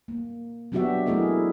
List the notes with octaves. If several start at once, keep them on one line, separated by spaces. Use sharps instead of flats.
A#3
F#3 B3 D4 F#4 G4 E5
A3 E4 G#4 A#4 D#5